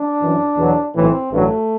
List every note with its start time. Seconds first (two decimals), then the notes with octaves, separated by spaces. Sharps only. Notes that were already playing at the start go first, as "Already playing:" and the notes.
Already playing: D4
0.21 F#2 E3
0.56 E2 B2 F#3
0.94 B1 A2 E3 C4
1.31 A1 G2 F#3 A3